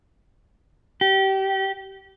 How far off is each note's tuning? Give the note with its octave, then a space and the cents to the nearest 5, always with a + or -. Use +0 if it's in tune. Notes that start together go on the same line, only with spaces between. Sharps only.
G4 -25